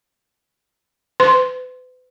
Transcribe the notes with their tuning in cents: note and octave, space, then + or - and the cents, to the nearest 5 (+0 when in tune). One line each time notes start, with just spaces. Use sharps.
B4 +40 C6 +0